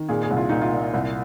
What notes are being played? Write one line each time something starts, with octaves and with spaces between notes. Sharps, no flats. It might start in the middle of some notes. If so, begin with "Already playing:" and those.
Already playing: D#3
A#2 G#4
G#4
C2
F4
A#2 D#4
F4
A#2
C2